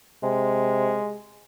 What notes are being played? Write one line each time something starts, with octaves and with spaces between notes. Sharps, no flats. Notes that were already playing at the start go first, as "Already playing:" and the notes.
C3 G#3